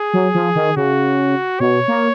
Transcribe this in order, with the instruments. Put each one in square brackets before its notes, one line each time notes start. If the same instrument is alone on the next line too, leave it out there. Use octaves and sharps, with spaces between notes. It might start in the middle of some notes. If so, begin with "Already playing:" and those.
Already playing: [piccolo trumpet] G#4
[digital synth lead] F#3
F3
D#3
[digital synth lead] C#3 [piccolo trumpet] F#4
[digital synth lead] B2 [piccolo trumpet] C#5
[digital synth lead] A#3